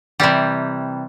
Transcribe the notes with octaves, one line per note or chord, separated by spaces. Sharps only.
C3 E3 G3